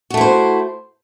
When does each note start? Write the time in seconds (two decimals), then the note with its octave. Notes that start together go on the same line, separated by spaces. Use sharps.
0.10 F#4
0.14 A3
0.17 E4
0.21 C5